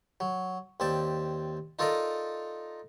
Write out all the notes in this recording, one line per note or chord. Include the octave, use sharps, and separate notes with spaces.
F#3
D#2 C4 D5 A5
D#4 F4 A4 A#4 D5 D#5